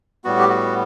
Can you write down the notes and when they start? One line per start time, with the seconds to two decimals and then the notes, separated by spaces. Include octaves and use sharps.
0.24 A2 G3 B3 F#4
0.39 G4
0.49 F#4